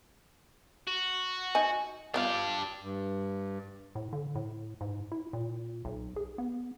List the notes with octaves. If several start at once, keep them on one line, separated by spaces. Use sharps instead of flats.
F#4
D#4 G#5
B3 D4 F4 G4 F5
G2
A2
D3
A2
G#2
E4
A#2
B1
G#4
B3